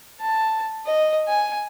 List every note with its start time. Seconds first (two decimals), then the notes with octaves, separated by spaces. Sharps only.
0.21 A5
0.86 D#5
1.28 G#5